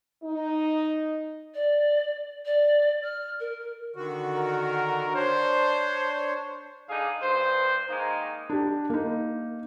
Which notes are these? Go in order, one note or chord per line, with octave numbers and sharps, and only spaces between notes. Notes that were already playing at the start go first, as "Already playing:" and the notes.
D#4
D5
D5
F6
A#4
D3 D#3 F#4
A#4
D4 C5 C#5
D3 D#4 G#4 F5
G2 C5
D#3 G#3 A#3 D#4
D4 G4
A#3 D#4